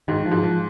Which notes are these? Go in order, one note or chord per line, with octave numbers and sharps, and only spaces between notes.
G#2 D#3
F3
G#2
F3